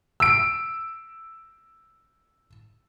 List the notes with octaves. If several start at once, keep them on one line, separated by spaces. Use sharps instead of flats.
E6 D7